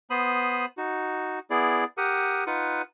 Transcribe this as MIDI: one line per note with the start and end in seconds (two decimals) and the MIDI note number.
0.10 0.66 59
0.10 0.66 72
0.10 0.66 83
0.10 0.66 87
0.77 1.39 63
0.77 1.39 66
1.50 1.84 59
1.50 1.84 64
1.50 1.84 68
1.50 1.84 74
1.97 2.44 67
1.97 2.44 70
1.97 2.44 78
1.97 2.44 87
2.47 2.82 63
2.47 2.82 65
2.47 2.82 71
2.47 2.82 78